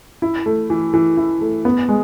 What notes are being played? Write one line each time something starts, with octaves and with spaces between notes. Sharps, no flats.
E4
A3
E3
E3
E4
A3
B3
G#3